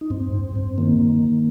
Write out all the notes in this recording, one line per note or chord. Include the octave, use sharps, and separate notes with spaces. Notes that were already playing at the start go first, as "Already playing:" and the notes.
D#4
G2 C4
G2
G2
D#3 A#3
D#3
D#3